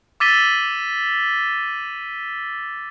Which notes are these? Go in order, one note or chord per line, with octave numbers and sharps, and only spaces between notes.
D6 E6 A6 B6 D#7 G7